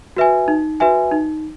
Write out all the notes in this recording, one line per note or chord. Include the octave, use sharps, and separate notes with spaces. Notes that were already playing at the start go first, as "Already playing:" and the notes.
F#4 B4 E5 G#5
D#4
F#4 B4 E5 G#5
D#4